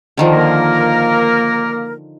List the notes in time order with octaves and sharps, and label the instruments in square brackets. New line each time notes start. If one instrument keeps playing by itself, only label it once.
[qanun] D3 D#3 F3
[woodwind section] A#3 A#4